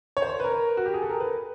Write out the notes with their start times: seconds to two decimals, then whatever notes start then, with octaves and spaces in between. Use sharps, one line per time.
0.17 C#5
0.22 C5
0.40 B4
0.44 A#4
0.77 F#4
0.86 G4
0.94 G#4
1.02 A4
1.09 A#4
1.20 B4